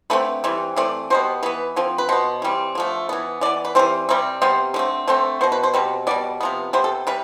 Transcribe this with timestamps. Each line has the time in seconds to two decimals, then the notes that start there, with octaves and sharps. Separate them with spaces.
0.10 D3 A3 C4 B4
0.44 E3 G3 C4
0.76 E3 A3 C4 D5
1.10 B2 G3 B3 C5
1.43 E3 B3 B4
1.76 D3 F3 C4
1.98 B4
2.09 B2 B3 C5
2.42 E3 G3 C4
2.75 D3 F3 A3
3.09 E3 B3
3.41 E3 B3 D5
3.65 B4
3.75 E3 G3 C4 C5
4.09 C3 G3 C4
4.41 C3 G3 B3 C5
4.74 D3 A3 C4
5.07 D3 A3 C4 C5
5.41 B2 B3 C5
5.52 B4
5.63 C5
5.74 B2 G3 C4 B4
6.07 B2 G3 B3 D5
6.41 C3 F3 B3
6.73 C3 G3 B3 C5
6.84 A4
7.07 C3 G3 B4